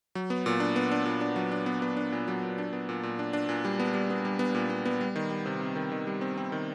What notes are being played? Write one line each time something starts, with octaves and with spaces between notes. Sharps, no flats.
F#3
B3
A#2
D4
B3
D4
A#2
D4
F#3
D4
B3
B3
D4
A#2
F#3
A#2
D4
B3
A#2
A#2
D4
D4
A#2
G3
B3
G3
B3
G3
B3
A#2
B3
B3
G3
D#3
G3
C3
C4
D#3
D#3
G3
C4
C4
D#3